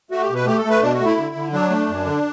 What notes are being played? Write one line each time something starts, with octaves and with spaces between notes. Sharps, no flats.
A3 F#4
G4
B2
B4
A3 G4
A4
A3
B4
B2 D4
F#4
A3
E4
D3
D3
F#3 D4
A3
F#2
D3